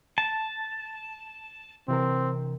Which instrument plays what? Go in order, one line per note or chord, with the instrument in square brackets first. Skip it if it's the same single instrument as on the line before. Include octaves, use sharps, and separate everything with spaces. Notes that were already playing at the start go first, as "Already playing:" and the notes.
[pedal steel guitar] A5
[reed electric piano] C3 E3 A#4 [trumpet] C4